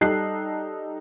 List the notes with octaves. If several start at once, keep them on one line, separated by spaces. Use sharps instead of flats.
G3 D#4 A4 D#6 F#6 C7